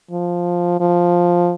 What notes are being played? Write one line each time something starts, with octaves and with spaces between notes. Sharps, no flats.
F3
F3